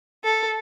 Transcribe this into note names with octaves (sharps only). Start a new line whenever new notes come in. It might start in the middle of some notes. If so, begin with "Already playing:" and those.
A4